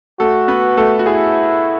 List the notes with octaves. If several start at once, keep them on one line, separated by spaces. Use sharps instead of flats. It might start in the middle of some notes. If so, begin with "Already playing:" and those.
A3 F#4 A4
B3 B4
A3 A4
F#4
E4 G#4